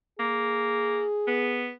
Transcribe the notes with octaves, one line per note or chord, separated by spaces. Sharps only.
A#3 G#4
B3